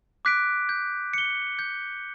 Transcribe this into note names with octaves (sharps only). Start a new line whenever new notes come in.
D6 F#6 B6 D7
G6
C#7 G7
G6